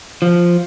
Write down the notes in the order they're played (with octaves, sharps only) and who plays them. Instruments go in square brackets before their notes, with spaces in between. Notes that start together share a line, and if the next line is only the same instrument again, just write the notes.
[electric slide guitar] F3